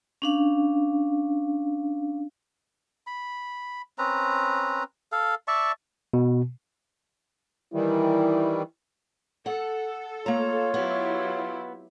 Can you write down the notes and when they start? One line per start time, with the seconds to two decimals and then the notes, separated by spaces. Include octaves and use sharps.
0.22 C#4 D4 F5
3.07 B5
3.98 C4 C#4 B4 A#5
5.12 A4 F5
5.48 D5 E5 A5 C#6
6.14 B2
7.74 D#3 E3 G3 E4
9.46 A4 F#5
10.26 A#3 F4 C#5 A#5
10.74 F#3 B3 E4 G4